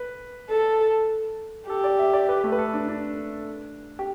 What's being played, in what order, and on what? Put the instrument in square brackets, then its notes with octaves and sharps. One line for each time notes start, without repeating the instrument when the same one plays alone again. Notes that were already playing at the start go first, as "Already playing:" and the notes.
Already playing: [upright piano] B4
[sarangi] A4
[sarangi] G4 [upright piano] A4
[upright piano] D5
E5
D5
B4
A3
B4
A4
D4
D4
G4